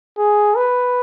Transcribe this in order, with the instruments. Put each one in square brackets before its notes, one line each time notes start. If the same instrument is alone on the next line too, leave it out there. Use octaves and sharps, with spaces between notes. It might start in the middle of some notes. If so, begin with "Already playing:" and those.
[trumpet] G#4
B4